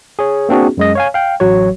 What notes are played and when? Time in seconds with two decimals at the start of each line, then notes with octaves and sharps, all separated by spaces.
0.19 G#4 C#5
0.49 A#3 C4 D4 F#4 G#4
0.77 F#2 G#3 D#5
0.95 C#5 F5 G#5
1.14 F5 G5
1.40 A1 F#3 F#4 C#5